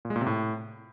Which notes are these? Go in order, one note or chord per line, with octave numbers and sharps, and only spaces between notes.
A#2
G#3
A#2
C3
A2